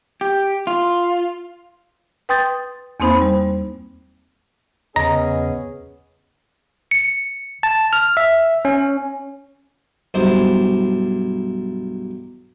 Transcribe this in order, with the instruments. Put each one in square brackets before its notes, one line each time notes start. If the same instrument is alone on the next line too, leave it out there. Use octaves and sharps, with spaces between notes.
[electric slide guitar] G4
F4
[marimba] B4 G5 C6 D#6 G6 A6
E2 A#3 C4 D#4 C5 B5
G3 C5
[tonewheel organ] E2 C#3 [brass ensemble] B3 C#4 G#4 [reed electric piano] D#5 [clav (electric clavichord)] A#5
[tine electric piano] C#7
A5
F6
E5
C#4
[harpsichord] B1 G2 E4 C5